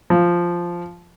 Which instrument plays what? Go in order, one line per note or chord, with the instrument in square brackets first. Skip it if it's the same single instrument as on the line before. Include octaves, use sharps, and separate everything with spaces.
[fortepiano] F3